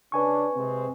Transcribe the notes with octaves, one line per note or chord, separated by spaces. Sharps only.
C#3 C#4 D4 B4 G#5 C#6
C3 G#3 C4